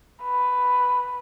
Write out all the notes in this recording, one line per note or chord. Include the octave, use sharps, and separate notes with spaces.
B4